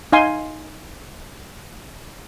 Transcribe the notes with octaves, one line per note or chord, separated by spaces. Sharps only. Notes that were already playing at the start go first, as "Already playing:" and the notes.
D#4 F5 G#5 C6